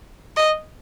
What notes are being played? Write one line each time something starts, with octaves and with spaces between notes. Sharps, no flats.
D#5